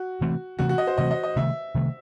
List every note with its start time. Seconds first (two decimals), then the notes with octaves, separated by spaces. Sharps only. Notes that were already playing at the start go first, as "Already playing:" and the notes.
Already playing: F#4
0.21 C3 E3 A3 C4
0.59 C3 E3 A3 C4 F#4
0.69 F#4
0.78 D#5
0.87 C5
0.98 C3 E3 A3 C4 D#5
1.11 D#5
1.23 D#5
1.36 C3 D#3 A3 E5
1.75 C3 D#3 A3